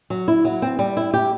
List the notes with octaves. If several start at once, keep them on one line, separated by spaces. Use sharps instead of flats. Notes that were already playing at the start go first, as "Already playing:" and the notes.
F#3
E4
F#3
C4
G3
E4
G4